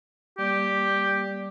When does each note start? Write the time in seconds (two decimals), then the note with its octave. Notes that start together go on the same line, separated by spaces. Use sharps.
0.38 G3 A#3 G4 D5